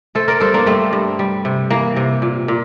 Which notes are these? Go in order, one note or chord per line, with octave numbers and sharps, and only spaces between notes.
A3 A4 C5
A#4 D5
G2 A4 C5
A#3 D4
G2 A3 C4
G2
G3
C3
E3 A#3
C3
A#2
A#2